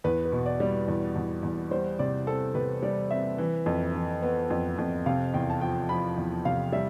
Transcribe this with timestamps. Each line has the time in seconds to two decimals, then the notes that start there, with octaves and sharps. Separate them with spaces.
0.04 E2 B4
0.25 B4
0.32 B2
0.46 D5
0.60 G3
0.88 E2
1.16 E2
1.43 E2
1.71 G3 C5
1.99 C3 D5
2.27 C4 A4
2.55 C3 B4
2.83 G3 D5
3.11 C4 E5
3.38 E3
3.66 F2
3.95 E3
4.22 B3
4.50 F2
4.78 F2
5.06 C3 F5
5.34 E2 G5
5.50 A5
5.61 F3 G5
5.89 F3 B5
6.18 E2
6.45 C3 F5
6.72 G3 E5